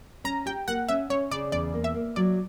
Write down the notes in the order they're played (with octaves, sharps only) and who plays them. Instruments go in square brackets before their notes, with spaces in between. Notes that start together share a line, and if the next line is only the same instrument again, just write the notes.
[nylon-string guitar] C#4 [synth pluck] A#5
[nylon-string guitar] G4 [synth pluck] G5
[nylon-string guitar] A#3 [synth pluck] F#5
[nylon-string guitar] C#4 [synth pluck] E5
[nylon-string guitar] C#4 [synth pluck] C#5
[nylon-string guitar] C#3 [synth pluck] D5
[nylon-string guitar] E2 [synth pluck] D5
[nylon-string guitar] A#3
[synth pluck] E5
[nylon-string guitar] A#3
[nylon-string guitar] F#3 [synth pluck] D5